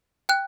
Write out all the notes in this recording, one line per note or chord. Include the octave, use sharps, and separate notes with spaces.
G5 F#6